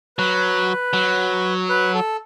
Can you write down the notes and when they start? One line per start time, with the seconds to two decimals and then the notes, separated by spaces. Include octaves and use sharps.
0.18 F#3 B4
0.93 F#3
1.69 B4
1.94 A4